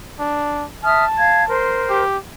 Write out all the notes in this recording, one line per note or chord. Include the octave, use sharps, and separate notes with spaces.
D4
E5 A5 D#6 F6
F5 G#6
A#4 C5 C6
G4